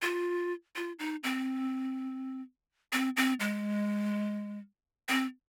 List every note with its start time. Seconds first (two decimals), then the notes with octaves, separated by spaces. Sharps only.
0.02 F4
0.76 F4
0.99 D#4
1.23 C4
2.93 C4
3.17 C4
3.40 G#3
5.09 C4